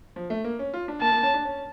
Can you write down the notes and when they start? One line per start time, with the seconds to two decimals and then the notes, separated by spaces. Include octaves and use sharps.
0.16 F3
0.30 A3
0.44 A#3
0.59 C#4
0.74 F4
0.88 D4
1.02 A#3 A5
1.12 A#3
1.23 C#4
1.34 D4
1.45 C#4